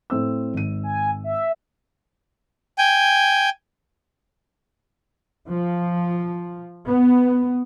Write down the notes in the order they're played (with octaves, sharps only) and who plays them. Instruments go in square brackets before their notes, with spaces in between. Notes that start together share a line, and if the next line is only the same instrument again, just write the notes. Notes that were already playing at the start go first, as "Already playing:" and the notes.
[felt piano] A2 C4 E6
G#1 D#7
[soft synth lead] G#5
E5
[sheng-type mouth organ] G5 G#5
[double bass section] F3
B3